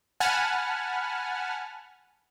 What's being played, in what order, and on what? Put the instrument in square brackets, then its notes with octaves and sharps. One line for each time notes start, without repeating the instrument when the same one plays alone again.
[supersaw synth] F#5 G#5 A5 B5 F6